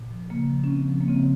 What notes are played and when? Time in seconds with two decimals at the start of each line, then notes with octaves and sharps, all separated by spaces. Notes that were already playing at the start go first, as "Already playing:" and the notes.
Already playing: A#2
0.11 F3
0.30 C#3 A#3
0.50 F3
0.64 C#4
0.69 C#3 C4
0.88 F3
1.01 A#3
1.08 C#3 C4